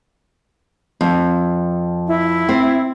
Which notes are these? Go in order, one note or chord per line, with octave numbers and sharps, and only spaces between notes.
F2
E4
C4